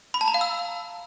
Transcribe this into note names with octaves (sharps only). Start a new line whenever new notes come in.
B5
A5
A#5
F5
E6